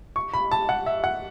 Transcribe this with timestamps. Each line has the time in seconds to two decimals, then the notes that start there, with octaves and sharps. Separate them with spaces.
0.16 C#6
0.34 B5
0.51 A5
0.69 F#5
0.86 E5
1.04 F#5